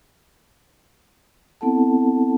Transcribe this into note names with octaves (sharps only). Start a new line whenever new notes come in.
B3 C4 E4 A4 F#5 A5